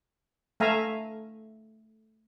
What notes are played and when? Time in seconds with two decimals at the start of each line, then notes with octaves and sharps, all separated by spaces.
0.60 A3 E5 F5 G#5 A#5